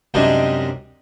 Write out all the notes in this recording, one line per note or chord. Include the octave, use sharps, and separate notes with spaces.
F#2 C3 G3 G#3 D4 D#4